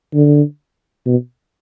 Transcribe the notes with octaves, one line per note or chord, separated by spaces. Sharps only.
D3
B2